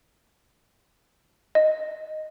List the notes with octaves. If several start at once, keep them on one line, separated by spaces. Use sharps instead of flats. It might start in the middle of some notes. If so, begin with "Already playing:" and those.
D#5